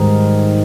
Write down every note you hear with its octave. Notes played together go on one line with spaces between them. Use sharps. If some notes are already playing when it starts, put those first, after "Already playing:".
Already playing: G#2 D#3 G3